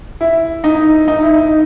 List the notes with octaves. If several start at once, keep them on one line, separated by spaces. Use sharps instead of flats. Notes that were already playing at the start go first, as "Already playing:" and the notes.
E4
D#4
D#4
E4
D#4